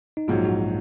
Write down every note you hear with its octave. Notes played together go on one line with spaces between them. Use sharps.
D#4
A#1 G#2 F#3 F4
F#4